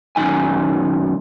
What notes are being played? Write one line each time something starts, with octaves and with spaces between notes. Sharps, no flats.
F#2 A#2 D#3 D#4 G#5